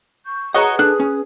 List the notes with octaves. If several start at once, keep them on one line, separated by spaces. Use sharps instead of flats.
C#6 G6
F#4 G#4 B4 C#5 D#5 F#5 A#5 D#6
D4 A4 F#6
C#4